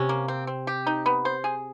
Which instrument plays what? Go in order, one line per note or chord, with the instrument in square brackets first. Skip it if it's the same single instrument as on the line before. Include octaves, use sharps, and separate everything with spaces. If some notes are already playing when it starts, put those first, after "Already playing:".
Already playing: [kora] C3 [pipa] C#4
[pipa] A#3
C4
C4
G4
D#4
B3
C5
G#4